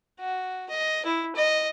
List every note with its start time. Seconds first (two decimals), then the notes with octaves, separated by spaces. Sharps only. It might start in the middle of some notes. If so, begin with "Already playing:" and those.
0.19 F#4
0.69 D#5
1.05 E4
1.36 D#5